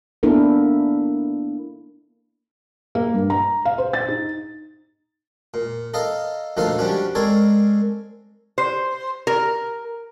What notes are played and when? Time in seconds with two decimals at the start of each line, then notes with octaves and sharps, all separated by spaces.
0.23 A#3 B3 D4 E4 A4 A#4
2.95 A#3
3.14 G2
3.30 A#5
3.65 F5
3.78 C5
3.93 A6
4.08 D#4
5.54 A#2
5.94 A4 D#5 F5 A#5
6.57 D2 A#2 F3 D#4 A4 F5
6.78 F3 G3 C#4 D4 F#4
7.15 G#3 C4 A4 A#4 C#5 D5
8.58 C5
9.27 A#4